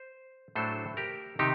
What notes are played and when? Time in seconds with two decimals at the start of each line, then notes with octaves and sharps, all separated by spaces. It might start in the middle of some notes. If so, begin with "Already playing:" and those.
Already playing: C5
0.55 A2 F#3 A3 D4 A4 C5
0.97 G4 A#4
1.39 C3 D#3 D#4 G4